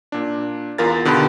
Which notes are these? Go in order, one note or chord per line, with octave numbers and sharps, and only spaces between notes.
A#2 D4
E2 F4 A#4 A6
B2 D3 D#3 G4 B5